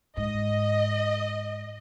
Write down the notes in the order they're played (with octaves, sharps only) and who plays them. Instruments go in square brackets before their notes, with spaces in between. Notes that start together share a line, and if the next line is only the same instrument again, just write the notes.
[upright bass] G#2 [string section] D#5